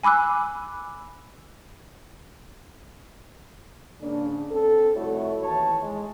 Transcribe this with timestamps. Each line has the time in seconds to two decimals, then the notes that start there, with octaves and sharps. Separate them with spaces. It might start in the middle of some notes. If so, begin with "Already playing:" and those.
0.03 G#5 B5 D6 E6 F#6
4.01 G#2 C#3 A#3 C#4 D4
4.50 C4 A4
4.94 C2 F2 A3 E4 F#4 C#5
5.41 D#2 E3 C#5 A5
5.81 G#3